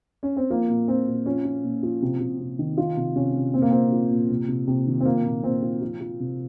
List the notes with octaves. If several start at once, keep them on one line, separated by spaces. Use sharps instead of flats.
C#4
C4
F3 A#3
A#2
F3 C4
A#2
F3 C#4
F3
A#2
F3
C3
C3
C3
D#3
D#3 F4
C3
C3 C#4
C3
A#2 C4
A#3
F3 C4
F3
A#2
C3
C3
C3
D#3
C4
F3 A#3
A#2
A#2 C4
F3
F3
F3
C3